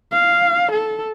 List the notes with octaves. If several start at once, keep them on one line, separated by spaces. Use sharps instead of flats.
F5
A4